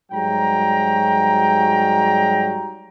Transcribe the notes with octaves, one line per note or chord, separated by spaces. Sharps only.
G#2 F#3 G3 G5 A#5